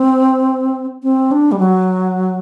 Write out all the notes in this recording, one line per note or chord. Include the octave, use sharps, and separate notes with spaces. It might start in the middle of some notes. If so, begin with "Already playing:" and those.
Already playing: C4
C4
D4
G3
F#3